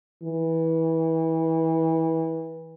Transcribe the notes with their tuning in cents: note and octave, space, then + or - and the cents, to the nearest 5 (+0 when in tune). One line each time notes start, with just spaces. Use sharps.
E3 -25